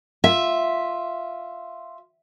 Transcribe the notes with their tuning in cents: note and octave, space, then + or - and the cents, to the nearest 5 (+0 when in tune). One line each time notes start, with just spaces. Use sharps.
F4 +0 E5 +0